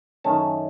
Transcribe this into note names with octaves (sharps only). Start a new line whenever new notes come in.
F#2 D#3 A3 C#4 A5